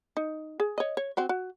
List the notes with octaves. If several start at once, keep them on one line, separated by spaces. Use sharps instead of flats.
D#4
G#4
C#5 D#5
C#5
C4 F#4 C5
F#4